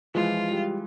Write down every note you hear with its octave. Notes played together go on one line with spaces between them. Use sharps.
E3 F3 G#3 F4
G3